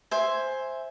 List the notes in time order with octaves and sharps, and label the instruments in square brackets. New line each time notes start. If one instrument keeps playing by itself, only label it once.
[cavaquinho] C5 E5 G#5